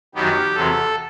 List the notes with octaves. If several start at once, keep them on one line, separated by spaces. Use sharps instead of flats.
F#2 D#3 F#3 B3 G4
E2 C3 F#3 B3 A4